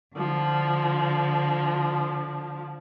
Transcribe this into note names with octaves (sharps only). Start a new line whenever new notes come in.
D3 F3